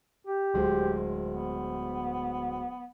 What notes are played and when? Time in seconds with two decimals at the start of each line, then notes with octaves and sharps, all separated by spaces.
0.27 G4
0.54 D1 G#3 C5
1.30 B3